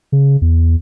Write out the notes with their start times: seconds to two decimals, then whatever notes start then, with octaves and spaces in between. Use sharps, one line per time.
0.12 C#3
0.42 E2